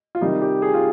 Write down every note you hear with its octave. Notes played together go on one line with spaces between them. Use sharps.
F4
C3 D#3 G3 D#4
G4
G#4
F4